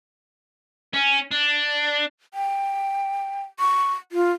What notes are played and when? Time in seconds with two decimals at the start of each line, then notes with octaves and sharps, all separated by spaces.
0.94 C#4
1.31 D4
2.34 G5
3.59 C#6
4.12 F4